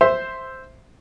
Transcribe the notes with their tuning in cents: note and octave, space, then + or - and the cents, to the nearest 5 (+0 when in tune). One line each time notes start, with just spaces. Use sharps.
C5 +0 E5 +0